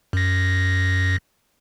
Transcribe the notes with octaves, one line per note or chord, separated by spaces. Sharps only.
F#2 A#6